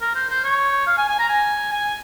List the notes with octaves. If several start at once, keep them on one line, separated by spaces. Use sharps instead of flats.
A#4
C5
C5
C#5
F5
G#5
G#5
A#5
G#5
G#5